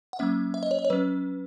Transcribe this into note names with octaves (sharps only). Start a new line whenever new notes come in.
F#5
F#3 A#3 C#4 E5
E5
D#5
C#5
D#5
C#5
F#3 C#4 B4